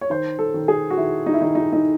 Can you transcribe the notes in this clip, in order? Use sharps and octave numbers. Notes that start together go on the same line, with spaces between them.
C#5
D#3 C5
A4
D#3
G#4
F#4
D#3 E4
D#4
E4
D#3 D#4
D#4
D#4